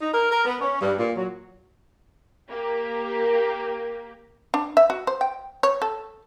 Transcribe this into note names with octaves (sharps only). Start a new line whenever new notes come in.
D#4
A#4
A#4
B3
C#4
G2
A#2
F#3
A#3 G4
D4
E5
F#4
C5
G5
C#5
A4